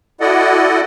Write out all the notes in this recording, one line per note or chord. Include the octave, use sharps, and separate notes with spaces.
E4 F#4 A4 D5 D#5 F#5